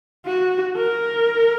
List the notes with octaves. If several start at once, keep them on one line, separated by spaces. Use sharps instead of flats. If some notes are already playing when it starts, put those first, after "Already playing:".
F#4
A#4